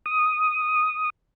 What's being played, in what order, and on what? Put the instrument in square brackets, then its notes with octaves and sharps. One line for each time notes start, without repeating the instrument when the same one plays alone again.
[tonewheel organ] D#6